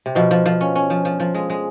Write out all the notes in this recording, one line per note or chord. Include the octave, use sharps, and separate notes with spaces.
C3
B2 F3
F3
F3
C#4
C#4
F3
F3
F3
G#3
G#3